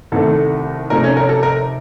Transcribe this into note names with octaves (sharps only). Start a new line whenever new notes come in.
C2 C3 D#3 A3 A4
C3 F3 A3 D#4 A#4
C#4 C#5
A#4
A4
A#4